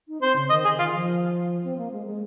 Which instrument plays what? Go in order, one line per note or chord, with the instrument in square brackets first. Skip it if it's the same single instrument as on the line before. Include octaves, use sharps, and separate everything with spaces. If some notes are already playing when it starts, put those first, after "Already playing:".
[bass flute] D#4
[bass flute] C4 [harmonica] C5
[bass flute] C#3
[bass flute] D#3 [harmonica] D#5
[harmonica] G#4
[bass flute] D#3 [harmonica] F4
[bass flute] F3
C4
A#3
G#3
G#3